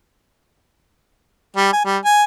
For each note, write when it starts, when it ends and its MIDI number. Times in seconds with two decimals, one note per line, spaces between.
1.56 1.69 55
1.73 1.81 80
1.85 1.97 55
2.05 2.24 80